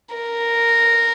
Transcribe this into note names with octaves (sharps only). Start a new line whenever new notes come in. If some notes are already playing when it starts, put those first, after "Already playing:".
A#4